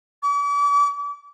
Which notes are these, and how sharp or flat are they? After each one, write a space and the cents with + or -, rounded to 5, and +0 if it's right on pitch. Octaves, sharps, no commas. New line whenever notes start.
D6 -45